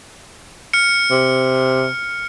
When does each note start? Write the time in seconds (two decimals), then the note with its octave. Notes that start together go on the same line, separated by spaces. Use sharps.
0.73 F6 C#7
1.10 C3